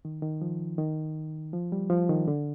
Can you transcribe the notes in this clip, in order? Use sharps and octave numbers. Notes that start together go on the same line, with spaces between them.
D#3
D#3
F3
D#3
F3
G3
F3
D#3
D3